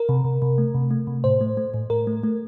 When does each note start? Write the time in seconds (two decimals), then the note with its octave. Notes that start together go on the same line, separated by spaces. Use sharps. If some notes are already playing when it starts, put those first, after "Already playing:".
Already playing: A#4
0.09 C3
0.24 C3
0.42 C3
0.58 A3
0.74 C3
0.91 A3
1.07 C3
1.24 A2 C5
1.41 A3
1.57 A3
1.74 A2
1.90 A2 A#4
2.07 A3
2.23 A3